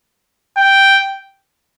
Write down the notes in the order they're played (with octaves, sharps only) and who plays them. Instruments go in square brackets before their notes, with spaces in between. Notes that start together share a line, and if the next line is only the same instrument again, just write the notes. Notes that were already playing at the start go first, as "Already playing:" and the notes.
[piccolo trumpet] G5